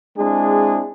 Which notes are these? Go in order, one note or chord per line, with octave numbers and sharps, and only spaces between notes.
G#3 C4 D4 E4 G#4